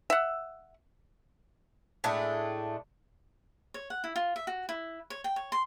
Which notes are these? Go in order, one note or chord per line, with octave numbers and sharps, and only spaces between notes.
E5 F#5
A2 G#3 A3 D4
C#5
F#5
E4
F4
E5
F#4
E4
C#5
G5
C#5
C6